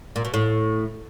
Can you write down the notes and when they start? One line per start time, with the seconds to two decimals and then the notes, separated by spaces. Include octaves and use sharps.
0.16 A#2
0.25 B2
0.34 A2